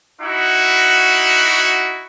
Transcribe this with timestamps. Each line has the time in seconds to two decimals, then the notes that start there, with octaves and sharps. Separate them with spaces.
0.21 D#4 E4 F#4